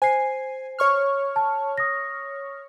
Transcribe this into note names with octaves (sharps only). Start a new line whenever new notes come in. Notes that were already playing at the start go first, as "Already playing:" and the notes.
C5 G#5 C7
C#5 C#6 F6
A5
D#6 A#6